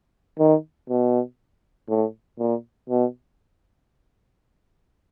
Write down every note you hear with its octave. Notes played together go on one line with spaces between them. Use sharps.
D#3
B2
A2
A#2
B2